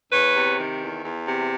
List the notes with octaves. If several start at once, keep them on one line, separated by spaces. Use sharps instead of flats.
E2 B4 C#5
C3
D#3
E2
E2
C3